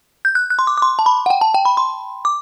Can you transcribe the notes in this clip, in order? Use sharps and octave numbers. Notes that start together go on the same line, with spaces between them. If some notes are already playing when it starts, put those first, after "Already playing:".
G6
F#6
F#6
C6
D6
D6
C6
A5
B5
F#5
G5
A5
G5
B5
C6
D6